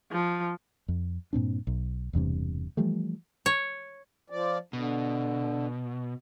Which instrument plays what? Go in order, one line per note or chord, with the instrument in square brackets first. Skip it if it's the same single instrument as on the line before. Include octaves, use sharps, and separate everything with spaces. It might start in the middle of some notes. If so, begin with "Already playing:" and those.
[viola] F3
[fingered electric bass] F2
G2 A#2 C4 D4
B1
E1 E2 G2 C3
E3 F3 G3 A3
[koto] C#5
[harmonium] F3 D5
[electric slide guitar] B2 [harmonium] D3